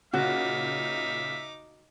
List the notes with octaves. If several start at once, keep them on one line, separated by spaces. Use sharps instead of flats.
A#2 C#3 D#4 F#4 E5 D6